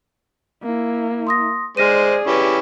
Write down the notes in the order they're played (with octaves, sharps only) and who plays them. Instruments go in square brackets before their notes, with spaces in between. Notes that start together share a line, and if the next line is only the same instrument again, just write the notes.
[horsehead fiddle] A#3 E4
[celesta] C6 D#6 A#6
[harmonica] G#3 C5 [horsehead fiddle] G#4 D5 [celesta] F6 A#6 D#7
[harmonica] C#4 E4 G4 [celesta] B4